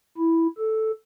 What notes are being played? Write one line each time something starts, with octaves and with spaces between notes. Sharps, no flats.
E4
A4